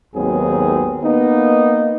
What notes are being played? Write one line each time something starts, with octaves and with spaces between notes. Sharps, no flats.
G#1 D#2 F#3 B3 C4 G#4
A#3 B3 D#4